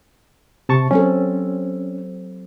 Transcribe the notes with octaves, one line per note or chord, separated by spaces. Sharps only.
C3 A5 C#6
F#3 C4 C#4 A4